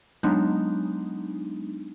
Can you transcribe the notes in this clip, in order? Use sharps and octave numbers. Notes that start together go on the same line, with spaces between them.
F#3 G#3 B3 D4 D#4